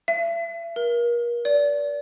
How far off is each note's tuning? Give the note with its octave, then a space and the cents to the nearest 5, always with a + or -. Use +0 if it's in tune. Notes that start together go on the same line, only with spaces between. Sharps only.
E5 +40
A#4 +35
D5 -25